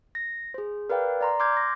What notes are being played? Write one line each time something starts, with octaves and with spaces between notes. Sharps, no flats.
A#6
G#4 C5
A#4 B4 D5 F5 G5
D5 A#5 C6
C6 D6 F6 G6 G#6
A#6